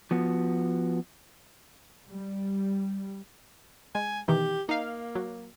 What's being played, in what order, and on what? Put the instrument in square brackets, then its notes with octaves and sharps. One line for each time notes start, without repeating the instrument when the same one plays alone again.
[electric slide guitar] F3 B3 F#4
[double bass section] G3
[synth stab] G#3 [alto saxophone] G#5
[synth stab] B2 D#3 E3 [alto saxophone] G4
[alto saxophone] A#3 [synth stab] D#4 F5
[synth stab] F#3